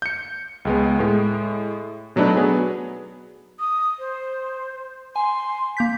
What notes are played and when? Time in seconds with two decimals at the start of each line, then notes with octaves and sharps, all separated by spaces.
0.02 G6 C#7
0.65 C#2 G#3 B3
0.99 A2 G#3
2.16 B2 F#3 A3 D4 D#4 B4
2.36 F#3 B3 G#4
3.59 D#6
3.99 C5
5.16 G#5 C6
5.77 A#3 G6 B6